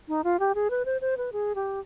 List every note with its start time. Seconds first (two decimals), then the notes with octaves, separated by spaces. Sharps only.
0.08 D#4
0.24 F4
0.40 G4
0.55 G#4
0.71 B4
0.85 C5
1.01 C5
1.17 B4
1.33 G#4
1.55 G4